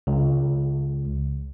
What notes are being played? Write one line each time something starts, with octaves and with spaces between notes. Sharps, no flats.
C#2